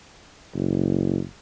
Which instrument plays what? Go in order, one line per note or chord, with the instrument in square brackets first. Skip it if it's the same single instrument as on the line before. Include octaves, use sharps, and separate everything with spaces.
[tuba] F#1